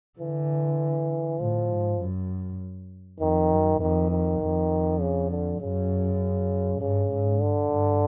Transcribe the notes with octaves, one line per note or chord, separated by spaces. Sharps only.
D3 E3
A2 F3
G#2
F#2
F2 D#3
F#2
F2 D#3
D#3
F2
C#3
D3
F#2 C#3
G2 C#3
G#2
G2 D3
G2